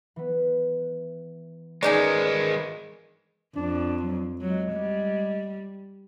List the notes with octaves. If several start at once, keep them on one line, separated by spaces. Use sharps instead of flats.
E3 B3
D#3 G#3 C#4 D#4 G#4 B4 D5
F2 D4
F#3
F#3 G#3
G3